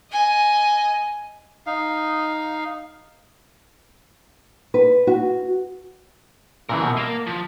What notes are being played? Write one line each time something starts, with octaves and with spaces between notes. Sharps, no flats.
D#5 G#5
D#4 F5
B4
F#4
A#2 C#3 E3 A#4 E5
B2 F3
A#3 D#5 F5 A5
F3